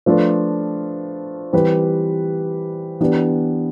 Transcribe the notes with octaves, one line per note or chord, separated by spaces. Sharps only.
F3 A3 D4 F4 B4
E3 G3 C4 G4 B4
E3 B3 D4 G4 B4